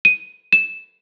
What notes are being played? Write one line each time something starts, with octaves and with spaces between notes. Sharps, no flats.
D#7
E7